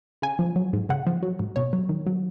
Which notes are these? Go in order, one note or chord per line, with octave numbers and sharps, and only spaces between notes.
C#3 G#5
F3
F#3
G#2
C#3 F#5
F3
F#3
G#2
B2 C#5
F#3
D#3
F#3